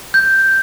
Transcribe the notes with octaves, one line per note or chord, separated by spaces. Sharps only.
G6